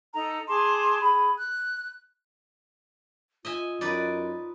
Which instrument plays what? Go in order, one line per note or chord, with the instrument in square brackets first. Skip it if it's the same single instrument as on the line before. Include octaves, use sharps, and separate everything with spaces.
[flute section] D#4 A4 A#5
G#4 A5 C6 D6
G#4 B5
F#6
[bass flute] F4 [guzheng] D#5 E5 G#5
[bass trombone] F#2 [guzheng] D#4 B4 D5